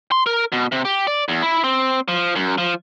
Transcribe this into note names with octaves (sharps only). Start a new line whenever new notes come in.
C6
A#4
B2
C3
G4
D5
E2
E4
C4
F3
F#2
F3